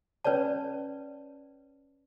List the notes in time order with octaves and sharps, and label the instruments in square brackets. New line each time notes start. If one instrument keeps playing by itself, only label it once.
[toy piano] C#4 B4 C#5 D5 A5